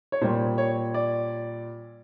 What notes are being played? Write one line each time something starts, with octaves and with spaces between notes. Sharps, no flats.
C#5
A#2 G3 C5
C#5
D5